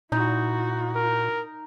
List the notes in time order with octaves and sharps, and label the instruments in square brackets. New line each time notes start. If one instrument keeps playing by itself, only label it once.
[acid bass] A#2 [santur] D#4 [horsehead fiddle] E4 F#4
[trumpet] A#4